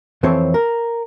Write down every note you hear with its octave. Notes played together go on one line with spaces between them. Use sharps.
F2 E3 C4 A4 C5 C#5
A#4